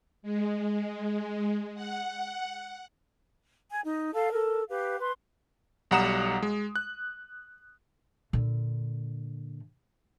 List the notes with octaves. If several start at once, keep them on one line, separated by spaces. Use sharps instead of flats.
G#3
F#5
G#5
D#4
A4 F5 A5
A4 A#4
G4 B4 F5
B4 C6
B1 G3 F#5 A#5 D#6 E7
G#3
F#6
A#2 D3